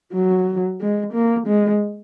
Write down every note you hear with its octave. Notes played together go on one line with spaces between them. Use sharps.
F#3
G#3
A#3
G#3